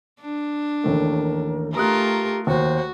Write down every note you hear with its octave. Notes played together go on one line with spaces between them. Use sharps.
D4
A1 D#2 A3 A#4
A3 F4 G4 A#4 A#5 D#6 F#6
D#2 F#4 C5